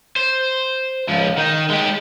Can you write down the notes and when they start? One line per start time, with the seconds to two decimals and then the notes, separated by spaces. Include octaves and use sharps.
0.16 C5
1.09 C#2 F3
1.37 D#3 D#4
1.70 G#3 G4